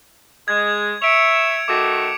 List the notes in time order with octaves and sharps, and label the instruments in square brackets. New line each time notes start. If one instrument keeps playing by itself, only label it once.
[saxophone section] G#3 [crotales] G#6
[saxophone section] C#5 E5 [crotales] C#7 D7 F7
[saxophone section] D#3 A3 F#4 [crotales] D6